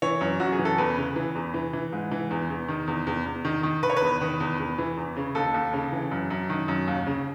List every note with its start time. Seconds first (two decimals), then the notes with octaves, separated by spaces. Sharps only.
0.02 E3 C#5
0.21 F#2
0.40 F#2 F#4
0.52 G#4
0.59 E3
0.65 A4
0.78 E2 B4
0.97 C#3
1.16 E3
1.35 E2
1.54 E3
1.73 E3
1.92 G#2
2.11 E3
2.31 E2
2.50 E2
2.68 D#3
2.87 E2
3.07 E2
3.26 E2
3.45 D#3
3.63 D#3
3.83 D#3 B4
3.90 C#5
3.96 B4
4.02 E2
4.21 D#3
4.40 E2
4.59 E2
4.78 E3
4.97 E2
5.16 C#3
5.35 D#2 A4
5.54 D#2
5.73 C#3
5.92 E3
6.11 F#2
6.30 F#2
6.50 D#3
6.68 F#2
6.87 D#2
7.06 C#3